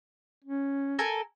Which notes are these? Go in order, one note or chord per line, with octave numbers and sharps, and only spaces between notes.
C#4
A4 A#4 G#5